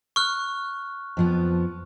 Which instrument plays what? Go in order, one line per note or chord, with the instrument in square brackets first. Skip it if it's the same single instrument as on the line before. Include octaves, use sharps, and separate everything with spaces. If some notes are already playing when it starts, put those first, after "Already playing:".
[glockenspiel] C#6 F6 F#6
[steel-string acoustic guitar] F2 F3 B3